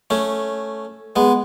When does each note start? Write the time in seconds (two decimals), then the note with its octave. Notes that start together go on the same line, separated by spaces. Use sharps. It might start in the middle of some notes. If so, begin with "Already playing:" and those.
0.10 A3 C#4
1.16 G#3 B3